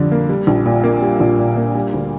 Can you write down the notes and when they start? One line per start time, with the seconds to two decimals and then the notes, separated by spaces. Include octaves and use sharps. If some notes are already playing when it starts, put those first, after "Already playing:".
Already playing: F2 D3 G3
0.12 A#3
0.29 G3
0.47 A#1
0.66 A#2
0.84 A#3
1.02 G3
1.20 A#1
1.39 A#2
1.57 A#3
1.75 G3
1.93 D2